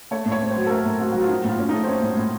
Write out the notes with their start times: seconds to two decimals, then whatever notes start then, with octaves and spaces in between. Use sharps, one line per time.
0.11 A3 C#5
0.26 A2
0.32 C#5
0.42 C4
0.51 C5
0.56 F#3
0.66 A4
0.70 A3 A#4
0.85 A2
1.00 C4 F#4
1.12 F#3 F#4
1.21 F4
1.29 C4 D#4
1.44 A2 F4
1.58 A2 C#4
1.69 D#4
1.73 A3
1.84 C5
1.88 C4 C#5
2.03 A2
2.17 A2